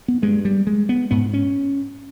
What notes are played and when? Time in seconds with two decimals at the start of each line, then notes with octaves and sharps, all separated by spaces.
0.08 B3
0.22 G2 G#3
0.45 G3
0.67 G#3
0.89 B3
1.11 G#2 B3
1.33 C#4